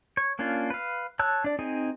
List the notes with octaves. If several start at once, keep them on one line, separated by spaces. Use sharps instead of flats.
C#5
A#3 C#4 D4 F4
B4 F5
C#5 A5 E6 F#6
D4 D5
C4 D#4 G#4 G#5